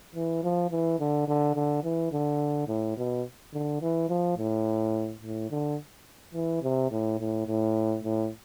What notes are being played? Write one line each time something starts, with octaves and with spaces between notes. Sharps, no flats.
E3
F3
E3
D3
D3
D3
E3
D3
A2
B2
D3
E3
F3
A2
A2
D3
E3
C3
A2
A2
A2
A2